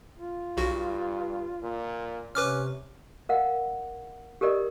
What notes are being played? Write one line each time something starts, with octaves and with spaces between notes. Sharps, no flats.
F4
B1 G2 F#4
A#2
C3 C#4 B4 D6 F6
A#4 D#5 F5 F#5
G4 A4 A#4 D5 D#5